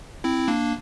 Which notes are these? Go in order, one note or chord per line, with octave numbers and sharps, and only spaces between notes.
C4 E4
A#3 D4